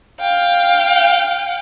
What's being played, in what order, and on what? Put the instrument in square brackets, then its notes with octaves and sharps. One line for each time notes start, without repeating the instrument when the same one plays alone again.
[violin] F5 G5